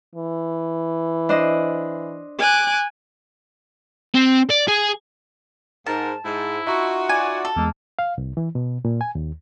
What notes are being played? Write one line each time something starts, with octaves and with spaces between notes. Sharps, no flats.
E3
D4 C5 D#5
G#5 D6 F#6
C4
D5
G#4
G#2 A#4 A5
G#2 E4
D#4 F4 F#4 E5 A#5 C#6
D5 G#5
A4
E2 G#3 A#3
F5
C2
E3
B2
A#2
G#5
D#2